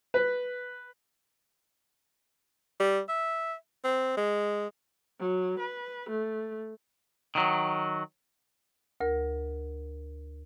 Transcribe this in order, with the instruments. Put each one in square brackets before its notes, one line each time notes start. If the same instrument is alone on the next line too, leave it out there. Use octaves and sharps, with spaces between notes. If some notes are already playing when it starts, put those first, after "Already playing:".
[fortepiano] B4
[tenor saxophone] G3
E5
C4
G#3
[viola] F#3
B4
A3
[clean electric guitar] D#3 F#3
[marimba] D2 A#4